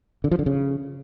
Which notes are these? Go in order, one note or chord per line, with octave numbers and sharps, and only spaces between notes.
D3
F3
D3
C#3